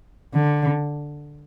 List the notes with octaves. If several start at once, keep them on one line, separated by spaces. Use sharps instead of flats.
D3